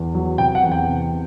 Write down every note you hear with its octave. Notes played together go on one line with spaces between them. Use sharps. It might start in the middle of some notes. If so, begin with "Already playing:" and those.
Already playing: E2
F#3
C3 G5
F#5
E2
G5
C3